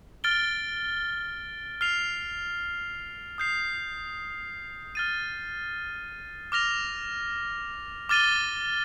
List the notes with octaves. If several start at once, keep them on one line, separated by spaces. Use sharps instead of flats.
F6 A6 D7 G7
F6 C7 F7
D#6 G6 C7
F6 A6 D#7
D6 F6 A#6 F7
D6 F6 A6 D#7 G7